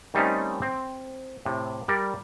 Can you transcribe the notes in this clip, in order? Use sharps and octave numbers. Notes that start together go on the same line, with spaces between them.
D#3 G3 A3 C4 C#4 D#4
C4
A2 C3
G3 A#4 D5